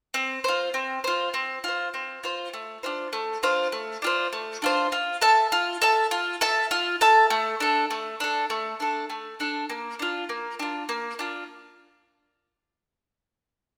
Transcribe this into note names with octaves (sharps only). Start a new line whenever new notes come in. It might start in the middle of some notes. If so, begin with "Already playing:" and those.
C4
F4 C5
C4
F4 C5
C4
F4 C5
C4
F4 C5
A3
D4 F4 C5
A3
D4 F4 C5
A3
D4 F4 C5
A3
D4 F4 C5
F4
A4 E5 A5
F4
A4 E5 A5
F4
A4 E5 A5
F4
A4 E5 A5
A3
D4 A4
A3
D4 A4
A3
D4 A4
A3
D4 A4
A#3
D4 F4
A#3
D4 F4
A#3
D4 F4